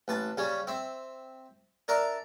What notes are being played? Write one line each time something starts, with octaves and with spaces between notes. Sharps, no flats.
A1 B4 A5
C#3 G3 C#4
C4 E5
D4 A#4 D5 E5